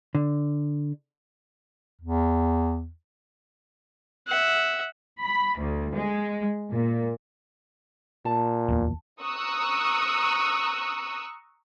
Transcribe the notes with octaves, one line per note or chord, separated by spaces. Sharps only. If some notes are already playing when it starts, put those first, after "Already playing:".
D3
E2
E5 F#5
B5
D2
G#3
A#2
A#2 A5
D1 E2 A#3
A#5 C#6 D#6 E6 F#6